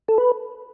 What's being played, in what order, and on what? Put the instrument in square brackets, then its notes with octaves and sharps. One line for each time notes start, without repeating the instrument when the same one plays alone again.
[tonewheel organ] A4
B4